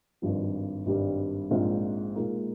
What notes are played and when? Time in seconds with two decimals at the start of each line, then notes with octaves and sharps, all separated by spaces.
0.22 G#1 G2 F3
0.86 G#1 G2 G3
1.51 A#1 G#2 F3 C4 F4
2.16 A#2 G#3 D#4 A#4